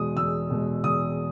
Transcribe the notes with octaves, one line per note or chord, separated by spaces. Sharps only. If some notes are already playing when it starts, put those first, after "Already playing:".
Already playing: E2 B2 G#3 D#6
E2 E6
B2 G#3
E2 D#6